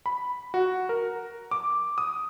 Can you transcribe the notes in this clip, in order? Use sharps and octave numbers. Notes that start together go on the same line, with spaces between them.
B5
F#4
A#4
D6
D#6